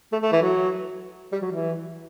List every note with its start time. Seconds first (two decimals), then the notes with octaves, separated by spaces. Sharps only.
0.12 A3
0.23 A3
0.32 E3
0.42 F#3
1.32 G3
1.42 F#3
1.51 E3